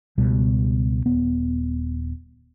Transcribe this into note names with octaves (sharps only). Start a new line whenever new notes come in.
C#2 B2 G3
D#1 B3